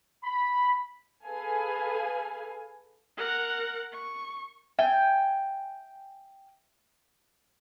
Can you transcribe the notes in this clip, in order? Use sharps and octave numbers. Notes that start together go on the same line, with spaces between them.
B5
G#4 A4 B4 F5 G#5
A#4 F#5
C#6
E5 G5 G#5